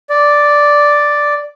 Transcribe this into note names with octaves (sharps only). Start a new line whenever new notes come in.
D5